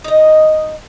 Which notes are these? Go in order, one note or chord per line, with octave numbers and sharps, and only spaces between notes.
D#4 D#5